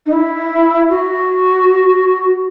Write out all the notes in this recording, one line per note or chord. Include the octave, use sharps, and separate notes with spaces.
D#4
E4
F#4